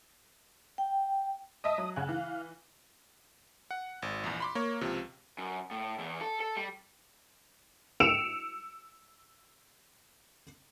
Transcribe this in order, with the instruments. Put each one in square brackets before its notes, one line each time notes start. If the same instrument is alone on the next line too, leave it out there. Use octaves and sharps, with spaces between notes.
[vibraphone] G5
[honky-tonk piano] D#5 E5 A5 [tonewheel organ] D#6
[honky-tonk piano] F#3
[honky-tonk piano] C#3 F#6 [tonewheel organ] F5 F#5 G#5
[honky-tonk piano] E3 [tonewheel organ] F5
[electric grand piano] F#5
G#1
A#1 E2
B5 C6 D6
A#3 C#5
C#2 C3 F3
[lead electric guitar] F#2
A2
E2
A4
A4
G3
[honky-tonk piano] E6 C#7 D7 E7 F7